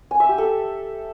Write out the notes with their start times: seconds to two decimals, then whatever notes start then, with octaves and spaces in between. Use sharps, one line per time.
0.11 G#5
0.20 E5
0.29 G4
0.38 A4